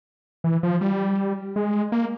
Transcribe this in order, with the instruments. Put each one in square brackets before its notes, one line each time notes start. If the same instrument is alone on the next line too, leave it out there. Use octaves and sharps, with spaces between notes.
[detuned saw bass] E3
F3
G3
G#3
A#3